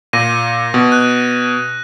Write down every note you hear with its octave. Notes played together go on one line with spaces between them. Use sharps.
A#2 A#6 D#7
B2
F#6